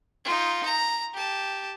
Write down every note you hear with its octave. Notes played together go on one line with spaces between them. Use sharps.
D#4 F4
A#5
G4 A5